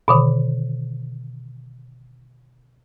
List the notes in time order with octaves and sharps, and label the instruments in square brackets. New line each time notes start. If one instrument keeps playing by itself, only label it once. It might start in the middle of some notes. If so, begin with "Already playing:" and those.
[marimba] B2 D3 D#3